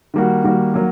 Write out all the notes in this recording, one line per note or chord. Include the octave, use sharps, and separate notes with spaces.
D#3 G3 A#3 F#4
D#3 G3 A#3 F#4
F#3 A#3